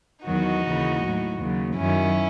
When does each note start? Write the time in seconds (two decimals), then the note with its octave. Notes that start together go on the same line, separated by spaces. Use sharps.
0.25 E2 D#3 F#3 D#4 F#4
0.63 D#2 C#3 E3
1.01 A2 F#3
1.39 D#2 C#3 F#3
1.77 F#2 D#3 F#3 C#4 E4